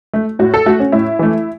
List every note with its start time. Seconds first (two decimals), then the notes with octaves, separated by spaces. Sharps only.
0.14 A3
0.39 A2 F#4
0.54 A4
0.66 A3 F#4
0.80 C#4
0.92 A2 E4
1.19 E3 A3